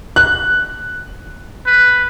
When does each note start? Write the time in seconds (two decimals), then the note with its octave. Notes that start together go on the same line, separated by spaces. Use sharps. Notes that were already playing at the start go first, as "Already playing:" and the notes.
0.16 F#6
1.66 B4